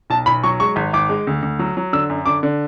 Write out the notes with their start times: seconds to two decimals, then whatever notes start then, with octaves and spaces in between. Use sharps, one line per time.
0.10 B1 A5
0.26 B1 B5
0.44 F#3 C#6
0.60 G#3 C#6
0.76 G#1
0.93 G#1 D6
1.09 G#3
1.27 D2
1.42 D2
1.59 F#3
1.77 F#3
1.93 D3 E6
2.10 F#2
2.26 D3 D6
2.43 D3